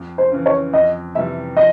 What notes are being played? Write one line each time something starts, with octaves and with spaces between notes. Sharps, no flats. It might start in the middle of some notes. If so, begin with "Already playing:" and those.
Already playing: F2
C5
C#3 E3
C#5
F2 D#5
C3 E3 G3 E5
F3 D#5